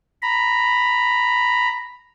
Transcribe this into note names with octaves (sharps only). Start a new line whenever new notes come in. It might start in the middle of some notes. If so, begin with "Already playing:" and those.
A#5 B5